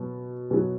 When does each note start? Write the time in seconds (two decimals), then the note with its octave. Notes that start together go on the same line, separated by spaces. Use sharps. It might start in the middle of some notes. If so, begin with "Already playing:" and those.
Already playing: B2 F#3
0.51 B2 F#3